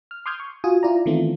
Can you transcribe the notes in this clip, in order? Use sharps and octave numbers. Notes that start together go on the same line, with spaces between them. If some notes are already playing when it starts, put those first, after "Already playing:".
F6
C6 D6 D#6 F6 G6 G#6
C#6
F4 F#4 G#5 D#6
E4 F4 D5 A#5
D#3 E3 A3 B3 C4 F4